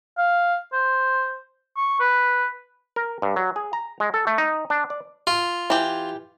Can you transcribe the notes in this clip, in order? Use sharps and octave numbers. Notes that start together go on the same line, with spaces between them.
F5
C5
C#6
B4
A#4
G2
F#3
G#4
A#5
G#3
A4
A3
D#4
D4
D5
F4
E3 G4